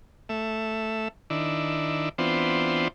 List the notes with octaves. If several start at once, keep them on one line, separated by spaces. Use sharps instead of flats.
A3 E5
D#3 D4 E4
E3 B3 C4 D4 F4 C5